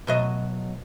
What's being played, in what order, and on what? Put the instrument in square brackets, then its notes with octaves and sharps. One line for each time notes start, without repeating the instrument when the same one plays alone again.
[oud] B2 F#3 D#5